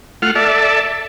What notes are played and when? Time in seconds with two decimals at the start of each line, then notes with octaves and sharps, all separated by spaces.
0.22 A3 F4 F#5 F6
0.35 A4 D5 E5 A5